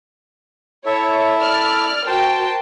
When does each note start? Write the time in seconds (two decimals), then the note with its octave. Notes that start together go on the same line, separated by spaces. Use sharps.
0.86 E4 A4 C#5 E5
1.40 D5 F6
2.07 F#4 A#4 C5 G5 A5